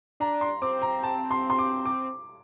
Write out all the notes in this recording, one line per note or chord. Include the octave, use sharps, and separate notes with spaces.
D4 A#5
C6
C4 D6
A#5
A5
C6
C6
D6
D6